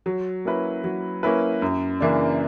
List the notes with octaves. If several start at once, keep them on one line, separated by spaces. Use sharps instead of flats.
F#3
A#3 C#4 E4 B4
F#3
A#3 C#4 E4 B4
F#2
C#3 E3 A#3 D4